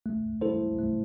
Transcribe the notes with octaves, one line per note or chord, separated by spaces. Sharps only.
A3
E4 A4 C5
A3